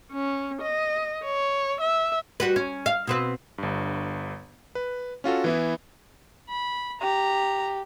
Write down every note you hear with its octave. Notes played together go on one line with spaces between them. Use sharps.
C#4
D#5
C#5
E5
G3 F#4 B4
C#4
F5
B2 C4 B4
G1 G2
B4
C#4 F4 F#4 A4
E3 B3 E4
B5
G4 A#5